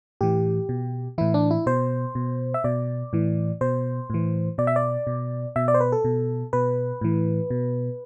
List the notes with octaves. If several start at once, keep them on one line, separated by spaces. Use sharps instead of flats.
A2 E3 G4
B2
A2 E3 E4
D4
E4
B2 C5
B2
E5
B2 D5
A2 E3
B2 C5
A2 E3
B2 D5
E5
D5
B2
B2 E5
D5
C5
B4
A4
B2
B2 B4
A2 E3
B2